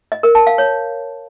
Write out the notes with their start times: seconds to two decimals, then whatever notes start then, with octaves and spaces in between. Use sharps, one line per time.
0.12 D#5
0.23 A#4
0.35 A5
0.47 F5
0.58 C#5